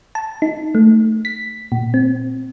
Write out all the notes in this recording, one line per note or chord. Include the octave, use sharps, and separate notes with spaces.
A5
D#4
A3
B6
A#2
C4